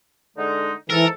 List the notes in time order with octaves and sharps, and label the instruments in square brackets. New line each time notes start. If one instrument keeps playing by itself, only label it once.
[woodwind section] D3 G#3 D#4
[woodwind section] G#2 A4 [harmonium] E3 [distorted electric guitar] A#4